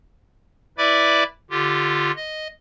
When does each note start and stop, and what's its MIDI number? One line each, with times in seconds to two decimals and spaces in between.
0.78 1.24 64
0.78 1.24 71
0.78 1.24 74
0.78 1.24 76
0.78 1.24 83
0.78 1.24 86
1.51 2.12 50
1.51 2.12 65
1.51 2.12 67
2.16 2.48 75